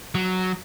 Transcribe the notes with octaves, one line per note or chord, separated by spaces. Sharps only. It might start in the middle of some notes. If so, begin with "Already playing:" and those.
F#3